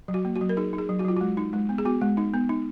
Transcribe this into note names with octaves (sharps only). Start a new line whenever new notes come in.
F#3
F#4
A#3
F#4
F#3
A#4
D#4 G#4
D#4
G#4
F#3
F#4
F#3 F4
G#3 F#4
D#4
G#3
B3
G#4
B3 F#4
G#3
D#4
B3
D#4